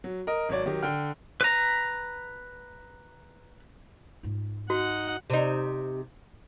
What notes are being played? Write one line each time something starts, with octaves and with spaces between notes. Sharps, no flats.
F#3
A#4 D#5
G#1 F#3 C#5 D5
D#3 F#3 G4
D3 G5 F6
B4 A#5
G#2 F4
D#4 F#4 F#5
C3 D#4